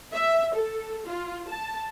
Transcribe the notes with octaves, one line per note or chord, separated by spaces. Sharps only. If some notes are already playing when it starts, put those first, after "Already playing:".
E5
A4
F4
A5